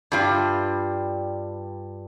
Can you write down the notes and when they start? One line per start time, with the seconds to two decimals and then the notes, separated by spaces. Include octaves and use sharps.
0.12 G2 G3 F4